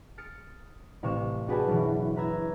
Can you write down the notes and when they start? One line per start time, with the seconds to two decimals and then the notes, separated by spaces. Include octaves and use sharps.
0.18 D#6 F6 A6 C#7 D7
1.03 A1 C3 F5 C#6 E7
1.48 D4 F#4 G#4 B4 G5 A5
1.67 F#1 B2 E3
2.16 B4 A#5 E6 G#6